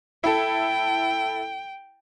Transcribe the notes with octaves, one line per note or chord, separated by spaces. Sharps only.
E4 A4 G5